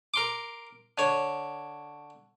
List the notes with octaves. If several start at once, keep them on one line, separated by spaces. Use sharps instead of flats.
A#4 C6 D6
D3 C#5